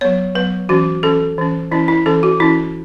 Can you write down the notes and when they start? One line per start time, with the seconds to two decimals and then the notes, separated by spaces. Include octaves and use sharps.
0.01 F#3 B3 C#5
0.35 F#3 B3 B4
0.69 E3 C#4 F#4
1.03 E3 C#4 A4
1.38 E3 C#4
1.71 E3 C#4 E4
1.88 E4
2.06 E3 C#4 A4
2.23 F#4
2.40 E3 C#4 E4